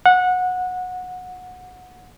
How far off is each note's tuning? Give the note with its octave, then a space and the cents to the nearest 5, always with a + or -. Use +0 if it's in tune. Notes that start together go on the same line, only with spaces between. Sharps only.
F#5 -20